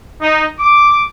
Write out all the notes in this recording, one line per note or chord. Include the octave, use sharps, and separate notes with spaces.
D#4
D6